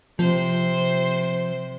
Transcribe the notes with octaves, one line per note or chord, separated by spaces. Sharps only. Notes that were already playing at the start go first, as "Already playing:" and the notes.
C3 F3 C5